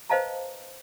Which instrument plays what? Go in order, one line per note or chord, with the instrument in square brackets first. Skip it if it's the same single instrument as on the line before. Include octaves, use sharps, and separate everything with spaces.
[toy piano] B4 C5 D#5 F5 A5 A#5